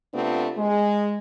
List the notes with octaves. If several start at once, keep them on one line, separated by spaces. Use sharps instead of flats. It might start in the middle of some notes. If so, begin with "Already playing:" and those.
C3 A3 B3 C4 D4 F4
G#3